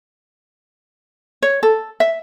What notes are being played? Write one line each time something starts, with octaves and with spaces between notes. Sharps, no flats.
C#5
A4
E5